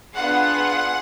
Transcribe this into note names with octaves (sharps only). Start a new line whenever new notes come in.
B3 D4 F4 G#4 F#5